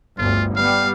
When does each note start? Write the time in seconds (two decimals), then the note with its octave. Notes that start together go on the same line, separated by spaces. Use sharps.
0.18 G1 D2 F4
0.56 G3 B3 F5